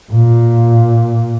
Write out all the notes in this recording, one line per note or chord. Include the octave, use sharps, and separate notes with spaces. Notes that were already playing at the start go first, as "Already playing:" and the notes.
A#2